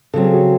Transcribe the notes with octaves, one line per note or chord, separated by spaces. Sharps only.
C#3 F#3 C4 A4
G#4
F#4